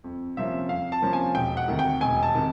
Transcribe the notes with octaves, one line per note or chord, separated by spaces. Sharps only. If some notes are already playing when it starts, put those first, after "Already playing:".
F2
C3 F3 A#3 C#4 E5
F2 F5
A5
C3 F3 A#3 C#4
G#5
E1 G5
F#5
D2 C3 D#3
G5
E1 G#5
A5
C3 D#3